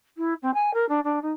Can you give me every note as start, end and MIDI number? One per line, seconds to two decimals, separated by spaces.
0.17 0.33 64
0.42 0.50 60
0.54 0.71 80
0.74 0.85 70
0.89 1.00 62
1.04 1.19 62
1.22 1.32 63